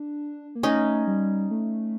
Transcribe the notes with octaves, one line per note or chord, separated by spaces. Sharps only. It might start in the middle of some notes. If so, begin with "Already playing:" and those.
Already playing: D4
A#3
A3 C#4 D#4
G3
A3